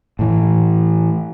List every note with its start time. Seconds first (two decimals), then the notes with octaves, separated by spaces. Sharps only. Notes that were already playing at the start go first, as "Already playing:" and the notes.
0.19 A2 E3